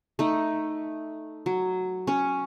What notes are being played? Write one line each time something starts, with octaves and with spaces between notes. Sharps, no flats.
A3 D#4
F#3
C#4 C#5